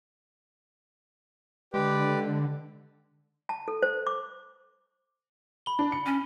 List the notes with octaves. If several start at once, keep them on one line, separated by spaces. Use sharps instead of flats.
D3 G#3 G4 B4 D5
A5
A4
C5
D6
B5 G7
D4
C#7
C#4